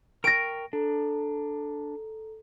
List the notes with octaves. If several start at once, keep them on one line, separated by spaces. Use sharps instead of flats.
A#4 G5 C#6 A#6 D7
D4 A4 A#5